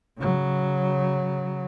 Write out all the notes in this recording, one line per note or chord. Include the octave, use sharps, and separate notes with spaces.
C#3 F#3